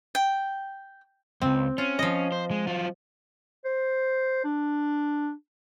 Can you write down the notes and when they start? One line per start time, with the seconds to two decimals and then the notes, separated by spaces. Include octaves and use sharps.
0.15 G5
1.42 C#2 F#2 C4
1.78 C#4 F4
1.99 F3 D#5
2.32 C5
2.51 G#3
2.67 F#3 F4
3.65 C5
4.44 D4